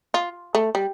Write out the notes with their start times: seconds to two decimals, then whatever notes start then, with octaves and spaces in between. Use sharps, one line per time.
0.14 F4
0.55 A3
0.75 G3